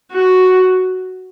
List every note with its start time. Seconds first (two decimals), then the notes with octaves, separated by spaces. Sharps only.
0.12 F#4